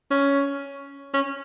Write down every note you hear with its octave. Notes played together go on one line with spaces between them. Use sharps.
C#4
C#4